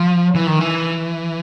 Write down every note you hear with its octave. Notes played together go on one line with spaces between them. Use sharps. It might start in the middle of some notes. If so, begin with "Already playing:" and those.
Already playing: F3
E3
D#3
E3